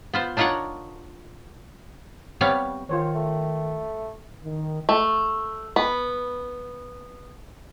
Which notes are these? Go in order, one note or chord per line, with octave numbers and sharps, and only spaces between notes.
B3 F4 C5
D4 D#4 F4 A#4 C#5 F#5
G3 B3 C4 C#5 F5
D#3 F4 C5 C#5
A3
D#3
A3
B3